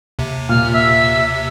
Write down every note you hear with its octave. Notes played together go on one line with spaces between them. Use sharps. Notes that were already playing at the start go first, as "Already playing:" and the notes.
D#2 C3
A#2 F6
E5 E6